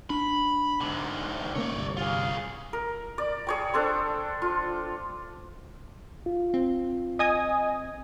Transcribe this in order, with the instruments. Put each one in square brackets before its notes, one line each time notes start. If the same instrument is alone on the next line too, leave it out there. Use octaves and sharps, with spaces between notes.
[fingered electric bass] D4 [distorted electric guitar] B5
[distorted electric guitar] G#2 D3
[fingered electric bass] C#3 A#3 [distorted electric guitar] C#5 D5
[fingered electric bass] G1 C2
[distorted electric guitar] F4 G#4
[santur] A#4
D5
G#4 C#5 G5
D4 A4 C5
F4
[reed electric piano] F4
[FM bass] C4
[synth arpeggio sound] D#5 G#5 D#6